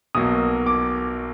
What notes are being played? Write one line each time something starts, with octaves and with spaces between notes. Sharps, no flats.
B1 B2 F#3 A#3 D#6
D6